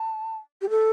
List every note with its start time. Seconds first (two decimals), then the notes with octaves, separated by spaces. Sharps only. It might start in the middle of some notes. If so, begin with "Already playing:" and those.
Already playing: A5
0.62 G4
0.70 A4